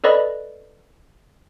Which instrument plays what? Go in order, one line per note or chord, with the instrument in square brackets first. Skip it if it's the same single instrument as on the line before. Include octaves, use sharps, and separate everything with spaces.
[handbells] A4 B4 D5 D#5 B5